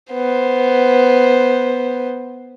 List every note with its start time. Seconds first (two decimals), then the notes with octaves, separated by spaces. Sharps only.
0.13 B3 C5